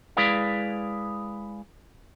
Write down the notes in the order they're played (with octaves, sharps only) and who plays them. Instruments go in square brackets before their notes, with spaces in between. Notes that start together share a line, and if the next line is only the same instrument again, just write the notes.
[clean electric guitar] G#3 E4 G#4 B4 D5 F5